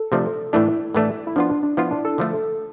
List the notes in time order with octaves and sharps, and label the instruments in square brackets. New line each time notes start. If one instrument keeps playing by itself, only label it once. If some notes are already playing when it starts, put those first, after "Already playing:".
Already playing: [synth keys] A4
[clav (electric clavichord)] C3 F3 A3 D4
[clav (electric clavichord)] A2 E3 A3 D4 [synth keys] E4
[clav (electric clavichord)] A2 E3 A3 D4
[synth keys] E4
[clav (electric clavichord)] F3 B3 F4 [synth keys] D4
[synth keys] D4
D4
[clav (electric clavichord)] F3 B3 F4 [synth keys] E4
[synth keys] D4
A4
[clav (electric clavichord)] D3 F3 A3 D4